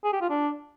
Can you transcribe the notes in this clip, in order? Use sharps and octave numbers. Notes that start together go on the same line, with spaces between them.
G#4
G4
F4
D4